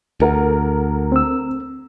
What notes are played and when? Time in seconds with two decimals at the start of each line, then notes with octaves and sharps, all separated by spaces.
0.20 D2 A4 A#4 F#5
1.12 C4 E6